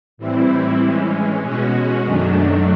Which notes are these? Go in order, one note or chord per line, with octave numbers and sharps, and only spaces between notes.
A2 E3 G3 C4 E4
E3 G#3 C#4
B2 G#3 C#4 F#4
F#2 D#3 F#3 A3 D4